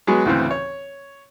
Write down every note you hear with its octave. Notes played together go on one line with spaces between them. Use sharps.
F#3 G#3 B3 F#4 G#4
D2 A2 C#3 E3 C4
C#5